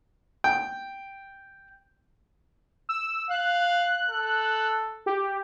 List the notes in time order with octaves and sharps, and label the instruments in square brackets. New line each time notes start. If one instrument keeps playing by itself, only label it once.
[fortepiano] G5
[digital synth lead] E6
[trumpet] F5 [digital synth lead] F#6
[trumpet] A4
[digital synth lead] G4